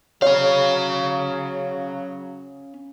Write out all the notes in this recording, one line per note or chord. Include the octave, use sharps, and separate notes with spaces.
C#3 F#3 C#4 C#5 F5